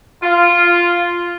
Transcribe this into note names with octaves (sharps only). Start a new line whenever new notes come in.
F4